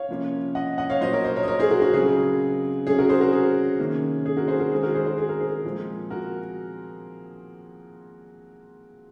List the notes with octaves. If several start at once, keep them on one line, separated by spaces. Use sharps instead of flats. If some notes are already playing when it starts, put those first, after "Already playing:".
Already playing: C#5 F5
C3 F3 A#3 C#4
D#5 F#5
D#5 F#5
C#5 F5
A#2 F#3 A#3 C5 D#5
A#4 C#5
C5 D#5
A#4 C#5
D#5
A#4 C#5
G#4 C5
F#4 A#4
F#4
C#3 F#3 C4 G#4
C3 F#3 C#4 G#4
F#4 A#4
G#4 C5
F#4 A#4
G#4
C3 D#3 A#3 C#4
G#4
F#4 A#4
G#4 C5
F#4 A#4
D#3 G#3 C4 G#4
F#4 A#4
G#4 C5
G#4 C5
G#4
A#4
G#4
A#2 F3 G#3 C4
F#4 A#4